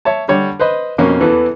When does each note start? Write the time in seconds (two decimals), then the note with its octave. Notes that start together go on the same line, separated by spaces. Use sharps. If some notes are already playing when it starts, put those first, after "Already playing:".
0.05 C#5 E5 A5
0.28 D3 G3 C#5
0.59 B4 C5 D#5 B5
0.98 F2 B2 A#3 C#4
1.20 E2 E3 B3 A4